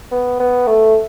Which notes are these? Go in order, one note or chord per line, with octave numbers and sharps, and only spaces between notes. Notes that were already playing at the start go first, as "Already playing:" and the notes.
B3
B3
A3